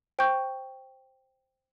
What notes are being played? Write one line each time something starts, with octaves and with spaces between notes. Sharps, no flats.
C5 G5 C#6 G6